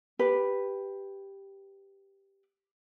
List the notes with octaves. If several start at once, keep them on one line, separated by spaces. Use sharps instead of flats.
G4 B4